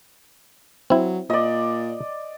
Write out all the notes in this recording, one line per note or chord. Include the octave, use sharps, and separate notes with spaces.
F#3 C4 E4
A#2 D5 D#5